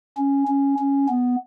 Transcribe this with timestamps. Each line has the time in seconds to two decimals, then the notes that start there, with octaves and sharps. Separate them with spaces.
0.17 C#4
0.48 C#4
0.79 C#4
1.09 B3